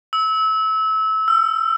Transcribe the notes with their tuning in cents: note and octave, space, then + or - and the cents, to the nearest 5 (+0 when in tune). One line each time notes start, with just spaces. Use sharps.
E6 -25
E6 +30